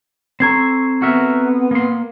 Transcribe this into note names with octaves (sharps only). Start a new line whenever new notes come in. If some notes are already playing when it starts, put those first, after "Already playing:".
C4 A4 A#5 C#6 G#6 C7
B3 F#4 A#4 E5
A#3 C6